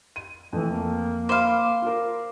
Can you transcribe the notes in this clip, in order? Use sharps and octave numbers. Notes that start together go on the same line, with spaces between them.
D#7
F2 E3 A3
A#3
C5 F5 B5 D6
F4 A#4